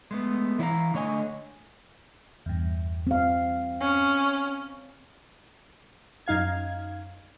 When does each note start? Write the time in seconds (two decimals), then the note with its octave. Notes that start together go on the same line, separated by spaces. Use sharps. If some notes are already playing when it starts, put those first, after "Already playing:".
0.11 G#3 A3 B3
0.59 E3 E4 C#5 E5 F5 A#5
0.94 D3 A3 C#5 D#5 G#5
2.46 E2 G2
3.07 C4 F5
3.81 C#4
6.26 F#2 D#4 F5 G#6